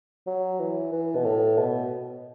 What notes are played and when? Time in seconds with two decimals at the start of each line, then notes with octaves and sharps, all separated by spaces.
0.27 F#3
0.59 E3
0.92 E3
1.15 B2
1.25 A2
1.57 B2